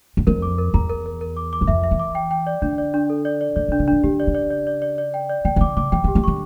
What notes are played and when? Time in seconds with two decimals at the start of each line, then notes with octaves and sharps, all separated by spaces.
0.17 E2
0.27 F2 A#4
0.42 D6
0.58 A#4
0.74 E2 A#5
0.90 A#4
1.06 A#4
1.21 A#4
1.37 D6
1.53 D6
1.61 E2
1.67 F2 E5
1.84 E5
1.91 E3
2.00 D6
2.15 G5
2.31 G5
2.47 D5
2.62 D3 D4
2.78 D5
2.94 D4
3.10 A4
3.25 D5
3.41 D5
3.56 D3 D5
3.68 C#3
3.72 D4
3.80 C#3
3.88 D3 D4
4.04 D3 G4
4.20 D5
4.27 C#3
4.35 D5
4.50 D5
4.67 D5
4.82 D5
4.98 D5
5.14 G5
5.29 D5
5.45 D3 G5
5.56 C#3
5.61 D3 D6
5.77 C#3 D6
5.92 E3 G5
6.04 D3 G4
6.15 E3
6.24 D3 C#6